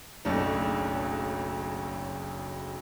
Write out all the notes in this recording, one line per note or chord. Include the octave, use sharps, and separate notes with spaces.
F#1 B1 C#3 A3 D4 D#4